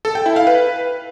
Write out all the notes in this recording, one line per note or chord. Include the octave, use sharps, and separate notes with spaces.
A4
G5
E4
F5
B4